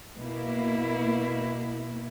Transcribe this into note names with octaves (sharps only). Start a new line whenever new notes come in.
B2 A#3 E4